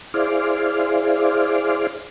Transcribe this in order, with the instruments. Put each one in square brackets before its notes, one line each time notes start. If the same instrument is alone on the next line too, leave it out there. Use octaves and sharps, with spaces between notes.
[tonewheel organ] E4 G#4 C5 D5 F5